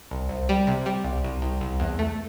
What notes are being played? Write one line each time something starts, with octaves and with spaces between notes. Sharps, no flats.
C2
C2
G3
C3
G3
C2
C2
C2
C2
E2
A3